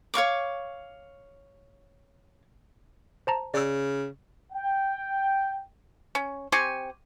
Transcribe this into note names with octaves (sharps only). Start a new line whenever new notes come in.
C#5 F5 C#6 D6
C5 A5 A#5
C#3 D5 E6
G5
C#4
C4 G4 G#5 C#6